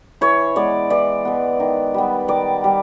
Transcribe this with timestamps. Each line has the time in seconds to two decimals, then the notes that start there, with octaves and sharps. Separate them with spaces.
0.21 E3 C#5
0.56 G#3 B3 D5
0.90 E3 D5
1.25 G#3 B3
1.60 D#3
1.94 G3 B3
2.28 D#3 D5
2.64 G3